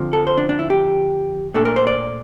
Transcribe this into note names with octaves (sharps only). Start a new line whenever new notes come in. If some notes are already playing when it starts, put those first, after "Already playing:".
Already playing: F2 D3 F3
A4
C5
D4
D4
E4
G4
A#2 A3 D4 A4
A#4
C5
D5